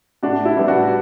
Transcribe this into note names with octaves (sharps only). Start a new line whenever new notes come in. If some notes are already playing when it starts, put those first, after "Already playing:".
A2 D4 F#4
E4
G3 B3 D4
D4 F#4